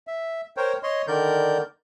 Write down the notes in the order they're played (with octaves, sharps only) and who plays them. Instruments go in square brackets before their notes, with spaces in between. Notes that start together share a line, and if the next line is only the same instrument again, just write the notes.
[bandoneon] E5
A#4 C5 C#5 G5
C#5 D#5 C6
D3 D#3 A#4 D5 G6